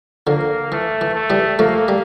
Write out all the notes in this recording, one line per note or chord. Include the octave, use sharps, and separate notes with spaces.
D3 F3 A#3
E3 A3
E3
A3
E3 G3
F3 A3 A#3
G3